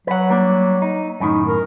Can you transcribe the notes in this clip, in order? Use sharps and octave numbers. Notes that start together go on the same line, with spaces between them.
F#3 B4 F#5
G3 A#3 D4
D#4
F#2 A2 D#3 D#4
A#4